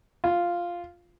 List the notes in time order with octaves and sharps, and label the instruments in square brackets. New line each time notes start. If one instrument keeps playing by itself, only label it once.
[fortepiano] F4